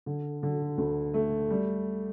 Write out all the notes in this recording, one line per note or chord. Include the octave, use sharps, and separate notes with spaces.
D3
D3
D2
A3
G3